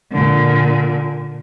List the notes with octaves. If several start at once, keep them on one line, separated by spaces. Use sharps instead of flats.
A#2 D3